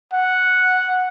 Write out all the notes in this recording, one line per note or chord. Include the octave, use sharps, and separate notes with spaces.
F#5